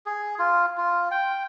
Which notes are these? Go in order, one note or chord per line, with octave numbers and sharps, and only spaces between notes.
G#4
F4
F4
G5